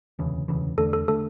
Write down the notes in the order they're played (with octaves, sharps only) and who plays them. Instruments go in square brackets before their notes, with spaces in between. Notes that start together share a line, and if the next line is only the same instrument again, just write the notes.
[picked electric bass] E1 D2 C#3 E3
E1 D2 C#3 E3
[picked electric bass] E2 D3 A3 D4 [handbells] A4
[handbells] A4
[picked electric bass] D3 A3 D4 [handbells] A4